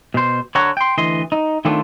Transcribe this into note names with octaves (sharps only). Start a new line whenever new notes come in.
B2 C5
D3 C#5 F#5 A#5
G5 C6
D2 E3 D#5 C6
D#4
D#3 A3 B3 C4 D4 F4